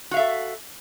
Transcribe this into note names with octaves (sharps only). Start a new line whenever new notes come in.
F#4 A4 E5 F5